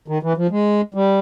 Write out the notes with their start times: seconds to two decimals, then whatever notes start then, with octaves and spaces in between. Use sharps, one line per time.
0.08 D#3
0.23 E3
0.37 F3
0.51 G#3
0.94 G3